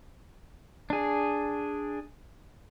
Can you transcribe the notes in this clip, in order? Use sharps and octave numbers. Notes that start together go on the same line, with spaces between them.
D4 G#4